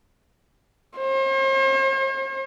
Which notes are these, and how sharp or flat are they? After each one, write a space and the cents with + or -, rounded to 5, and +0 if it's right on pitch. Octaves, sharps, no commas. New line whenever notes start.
C5 +45